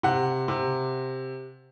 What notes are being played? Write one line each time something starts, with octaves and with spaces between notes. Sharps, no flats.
C3 F#5
C3